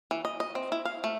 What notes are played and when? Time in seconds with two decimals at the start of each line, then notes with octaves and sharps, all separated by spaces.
0.11 E3
0.25 D#5
0.40 D#5
0.55 C4
0.72 E4
0.85 F5
1.04 A3